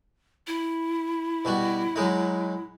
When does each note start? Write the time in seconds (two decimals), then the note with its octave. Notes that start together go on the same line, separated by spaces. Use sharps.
0.47 E4
1.45 B2 G3 F#4
1.96 F#3 G#3 D#4